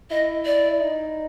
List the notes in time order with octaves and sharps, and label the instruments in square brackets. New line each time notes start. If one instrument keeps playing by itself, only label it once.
[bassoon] E4 [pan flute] D#5
[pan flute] D5
[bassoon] D#4